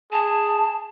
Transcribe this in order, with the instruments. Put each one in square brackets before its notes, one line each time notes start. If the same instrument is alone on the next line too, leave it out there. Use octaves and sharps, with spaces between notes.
[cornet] G#4 [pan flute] A5